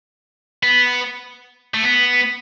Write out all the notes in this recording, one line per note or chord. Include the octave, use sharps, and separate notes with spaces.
B3
A3
B3